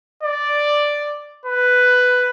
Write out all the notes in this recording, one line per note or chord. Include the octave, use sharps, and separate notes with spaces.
D5
B4